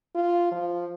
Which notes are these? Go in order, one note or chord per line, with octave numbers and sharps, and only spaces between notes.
F4
F3